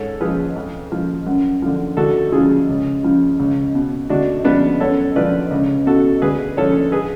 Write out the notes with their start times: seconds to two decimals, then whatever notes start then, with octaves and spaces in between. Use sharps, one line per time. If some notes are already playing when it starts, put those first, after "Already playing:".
Already playing: G#2 A4 C#5
0.21 F3 G#4 B4
0.56 F2
0.92 F3
1.26 F#2
1.62 D3 F3
1.97 D2 F#4 A4
2.32 C#3 F3 F4 G#4
2.69 C#2
3.03 C#3 F3
3.39 C#2
3.75 B2
4.09 D2 D4 F#4
4.44 C#3 F3 B3 D4
4.80 F#2 A4 C#5
5.15 D3 F3 B4 D5
5.51 C#2
5.86 B2 F#4 A4
6.22 D2 G#4 B4
6.57 D3 F3 A4 C#5
6.92 G#4 B4